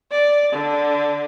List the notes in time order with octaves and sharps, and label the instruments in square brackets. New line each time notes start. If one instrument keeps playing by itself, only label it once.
[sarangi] D5
D3